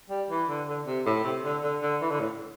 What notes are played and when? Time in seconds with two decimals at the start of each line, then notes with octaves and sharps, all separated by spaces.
0.10 G3
0.30 E3
0.48 D3
0.68 D3
0.86 C3
1.06 A2
1.24 C3
1.44 D3
1.63 D3
1.82 D3
2.02 E3
2.11 D3
2.20 A2